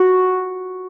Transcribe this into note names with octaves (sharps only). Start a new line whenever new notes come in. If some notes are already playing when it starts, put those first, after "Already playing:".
Already playing: F#4